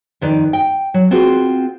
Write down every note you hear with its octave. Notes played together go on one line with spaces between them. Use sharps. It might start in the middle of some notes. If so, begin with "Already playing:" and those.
F2 D#3 B4 D5
G5
F#3
C4 F4 F#4 G#4 B4